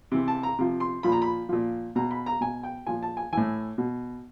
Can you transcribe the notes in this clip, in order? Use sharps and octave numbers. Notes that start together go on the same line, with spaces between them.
C3 E3
A5
A#5
C3 F3
C6
A#2 F3 B5
A#5
B5
A#2 F3
B2 A#5
B5
A#5
B2 G#5
G5
A#2 F3 G#5
A5
G#5
A2 E3 G#5
B2